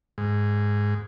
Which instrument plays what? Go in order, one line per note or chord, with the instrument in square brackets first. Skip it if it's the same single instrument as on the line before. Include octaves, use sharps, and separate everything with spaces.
[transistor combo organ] G#2